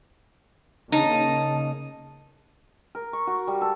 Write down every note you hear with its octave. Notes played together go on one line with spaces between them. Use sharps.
C#3 A#3 D#4 A5
A#4
C#6
F#4
G3
A4